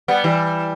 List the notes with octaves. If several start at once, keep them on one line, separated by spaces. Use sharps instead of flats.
G3 B3
E3 G3